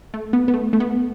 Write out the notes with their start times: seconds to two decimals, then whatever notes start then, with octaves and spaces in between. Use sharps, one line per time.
0.14 A3
0.33 B3
0.48 B3
0.54 A3
0.73 A3
0.80 B3